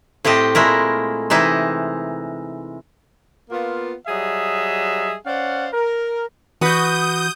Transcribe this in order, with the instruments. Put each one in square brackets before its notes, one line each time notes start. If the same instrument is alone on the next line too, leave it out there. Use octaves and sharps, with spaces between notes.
[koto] A2 C4 G4 D#5 A5
A#2 G#3 A3 E4 A#4
C3 E3 D#4 E4
[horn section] A#3 B3 F4
F#3 G3 G#4 D#5 E5
C#4 C5 D5 F5 F#5
A#4
[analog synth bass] E3 [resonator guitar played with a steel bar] F#4 B4 [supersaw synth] D#6 G6